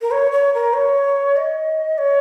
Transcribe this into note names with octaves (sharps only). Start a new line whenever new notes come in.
A#4
C#5
C#5
A#4
C#5
D#5
C#5